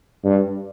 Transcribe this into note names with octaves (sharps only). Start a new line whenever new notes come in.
G2